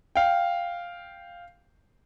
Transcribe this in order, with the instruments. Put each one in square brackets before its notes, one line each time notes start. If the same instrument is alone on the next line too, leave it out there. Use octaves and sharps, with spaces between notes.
[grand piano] F5 G5